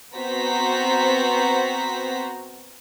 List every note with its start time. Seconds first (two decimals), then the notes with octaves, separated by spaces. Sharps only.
0.16 B3 C4 F#4 C5 A#5 B6